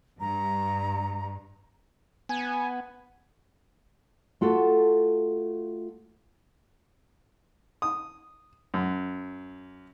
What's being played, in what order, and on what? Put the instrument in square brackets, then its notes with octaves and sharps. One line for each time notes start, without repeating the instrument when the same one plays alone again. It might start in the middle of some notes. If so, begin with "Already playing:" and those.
[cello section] G2 [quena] A#5
[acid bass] B3 [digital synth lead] G#5
[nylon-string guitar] A3 F4 F#4 A4
[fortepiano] D#6
F#2